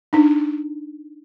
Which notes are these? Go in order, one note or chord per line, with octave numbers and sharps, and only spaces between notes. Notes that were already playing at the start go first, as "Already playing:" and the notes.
D4 D#4